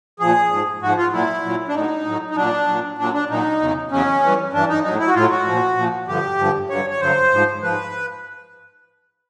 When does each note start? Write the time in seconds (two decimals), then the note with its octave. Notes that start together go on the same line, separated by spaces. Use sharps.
0.20 A#2 F3 G#4
0.50 G#2 F3
0.82 G#2 F3 F#4
0.97 F4
1.12 A#2 F#3 E4
1.44 A#2 F#3
1.68 D4
1.74 A2 F#3 D#4
2.05 A2 F#3
2.31 D#4
2.36 A#2 F#3 D4
2.67 A#2 F#3
2.98 A#2 F#3 D4
3.14 D4
3.29 A#2 F#3 D#4
3.60 E2 C#3 F#3
3.91 E2 C#3 F#3 C#4
4.23 G2 E3
4.53 G2 E3 D4
4.69 D#4
4.84 A2 F#3 D#4
4.99 E4
5.07 F#4
5.15 A2 F#3 F4
5.30 F#4
5.46 A#2 F3
5.76 A#2 F3
6.07 G2 D3 F3 G4
6.38 G2 D3 F3
6.70 G2 D3 F#3 C#5
6.90 C#5
7.00 G2 D3 F#3 C5
7.32 G#2 F3
7.62 G#2 F3 B4